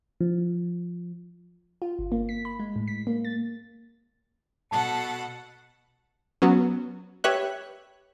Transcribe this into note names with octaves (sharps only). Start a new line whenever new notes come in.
F3
F4
G1
A#3
B6
B5
G#3
A2
B6
A#3
A6
B2 A4 F#5 A5
F#3 B3 C#4
G4 B4 C#5 E5 F#6